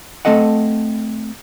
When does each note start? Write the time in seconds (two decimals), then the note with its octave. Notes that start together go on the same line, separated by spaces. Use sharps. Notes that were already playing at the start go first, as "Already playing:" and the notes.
0.25 A3 C4 A4 D#5 F#5